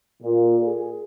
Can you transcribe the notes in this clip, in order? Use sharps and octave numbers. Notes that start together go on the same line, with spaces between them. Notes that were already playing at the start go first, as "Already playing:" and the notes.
A#2
G#4